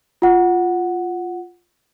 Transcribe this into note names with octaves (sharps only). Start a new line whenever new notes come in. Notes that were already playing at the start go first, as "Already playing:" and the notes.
F4 F#5